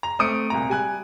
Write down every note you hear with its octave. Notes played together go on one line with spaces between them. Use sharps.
A#5 F7
A3 C4 D#6 C#7 D7
C2 A#2 A#5
G3 G#5 F#6